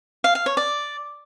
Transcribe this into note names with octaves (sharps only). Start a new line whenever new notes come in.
F5
F5
C#5
D5